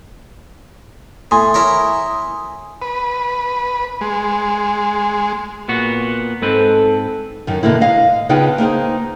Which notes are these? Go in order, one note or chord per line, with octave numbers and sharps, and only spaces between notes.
A2 G#5 C6 D#6
E4 A#4 C#5
B4
G#3
A#2 B3 F#4
G#2 C4 A4 B4
F#2 D#3
B2 D3 A#3 E4
D#5 F5
C#3 B3 D4 D#4 F4 G5
A#3 D#4 G#4 C5